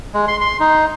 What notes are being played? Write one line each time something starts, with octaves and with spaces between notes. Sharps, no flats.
G#3
C6
C6
D#4